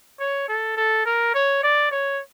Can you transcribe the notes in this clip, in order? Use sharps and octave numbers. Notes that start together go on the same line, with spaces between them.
C#5
A4
A4
A#4
C#5
D5
C#5